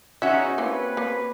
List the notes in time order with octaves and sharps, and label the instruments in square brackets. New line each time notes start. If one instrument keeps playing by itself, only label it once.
[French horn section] E2 G#3 D#4 [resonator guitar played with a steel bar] C#4 F#4 [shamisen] E5
[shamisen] A#3 E4 [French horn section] C4 B4
[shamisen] A#3